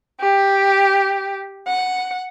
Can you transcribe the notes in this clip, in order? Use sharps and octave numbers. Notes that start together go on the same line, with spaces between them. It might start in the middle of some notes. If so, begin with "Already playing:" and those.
G4
F#5